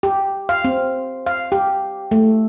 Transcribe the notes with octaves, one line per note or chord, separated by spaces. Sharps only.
G4
F5
C4
F5
G4
A3